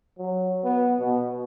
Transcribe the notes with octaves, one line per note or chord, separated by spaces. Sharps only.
F#3
B3
B2